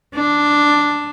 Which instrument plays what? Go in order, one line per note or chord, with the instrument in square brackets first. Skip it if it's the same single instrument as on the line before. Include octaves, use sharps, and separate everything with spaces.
[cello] D4